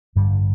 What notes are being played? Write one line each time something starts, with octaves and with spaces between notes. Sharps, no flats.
A1 G2 D3 G3